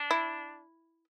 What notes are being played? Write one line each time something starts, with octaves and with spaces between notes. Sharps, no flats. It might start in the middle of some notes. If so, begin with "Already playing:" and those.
Already playing: D4
E4